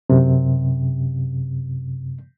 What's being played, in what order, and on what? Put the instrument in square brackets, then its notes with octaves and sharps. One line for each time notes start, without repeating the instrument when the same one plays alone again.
[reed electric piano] F#2 C3